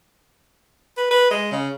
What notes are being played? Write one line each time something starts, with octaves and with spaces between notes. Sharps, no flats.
B4
B4
G#3
C#3